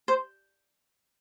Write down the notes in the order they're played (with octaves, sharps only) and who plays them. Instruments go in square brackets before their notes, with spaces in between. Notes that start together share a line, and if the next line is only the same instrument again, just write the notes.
[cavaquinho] C5